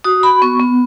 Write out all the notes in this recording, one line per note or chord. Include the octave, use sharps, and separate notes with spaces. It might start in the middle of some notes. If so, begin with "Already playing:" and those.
F#4 D#6
F#4 B5
B3 C#6
B3